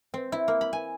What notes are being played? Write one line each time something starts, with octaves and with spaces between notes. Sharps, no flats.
C4
E4
A#3
B5
G#5